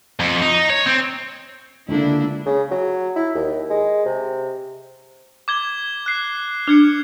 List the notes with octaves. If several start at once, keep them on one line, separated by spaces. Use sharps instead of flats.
F2
D#4
C#5
C4
C#2 D3 A#3 D4 E4
C#3
F#3
E4
D#2
G#3
C3
D6 G#6 G7
F#6 C7
D4 F6 G#6 C#7